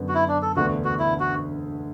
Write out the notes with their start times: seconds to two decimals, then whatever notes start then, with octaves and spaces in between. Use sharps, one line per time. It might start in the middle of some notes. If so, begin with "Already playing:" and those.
Already playing: F#2 D3 B3
0.09 F#4
0.15 E4
0.28 D4
0.42 A4
0.56 E1 D2 D3 B3 F#4
0.85 F#4
0.99 E4
1.20 F#4